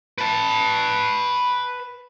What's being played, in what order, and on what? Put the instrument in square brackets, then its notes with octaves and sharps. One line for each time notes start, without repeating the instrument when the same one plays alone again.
[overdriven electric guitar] B4 A5